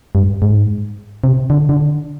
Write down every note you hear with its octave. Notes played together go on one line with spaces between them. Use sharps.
G2
G#2
C3
D3
D3